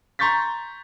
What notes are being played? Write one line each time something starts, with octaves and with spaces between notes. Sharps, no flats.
A#5 C6 C#6 G6 A6 B6